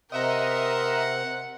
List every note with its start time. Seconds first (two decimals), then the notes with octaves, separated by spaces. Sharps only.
0.12 C3 A#4 D#5 E5 F#5 A#5 C6